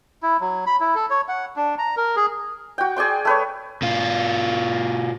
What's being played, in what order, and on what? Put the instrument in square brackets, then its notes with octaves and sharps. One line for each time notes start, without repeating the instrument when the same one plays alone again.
[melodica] E4
F#3
B5
E4
A4
C#5
F#5
D4
A#5
A#4
G#4
[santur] F#4 G5
G#4 D5 G5 C6
A3 B4 C#5
[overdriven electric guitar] B2 F4